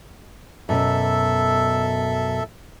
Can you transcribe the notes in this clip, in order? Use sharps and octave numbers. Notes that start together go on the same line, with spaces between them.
F#2 B2 A4 E5